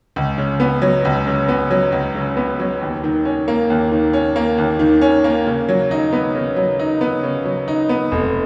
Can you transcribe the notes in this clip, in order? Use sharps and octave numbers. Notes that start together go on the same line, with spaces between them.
C#2
C#3
B3
F#3
C#2
C#3
B3
F#3
C#2
C#3
B3
F#3
D#2
D#3
C#4
A#3
D#2
D#3
C#4
A#3
D#2
D#3
C#4
A#3
C#3
F#3
D#4
B3
C#3
F#3
D#4
B3
C#3
F#3
D#4
B3
F1